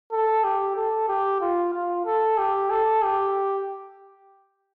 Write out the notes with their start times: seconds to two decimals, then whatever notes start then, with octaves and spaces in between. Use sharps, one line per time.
0.12 A4
0.44 G4
0.76 A4
1.08 G4
1.41 F4
1.73 F4
2.05 A4
2.38 G4
2.70 A4
3.03 G4